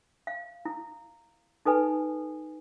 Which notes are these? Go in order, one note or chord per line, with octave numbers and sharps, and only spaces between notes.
F5
E4
D#4 A4 B4 G#5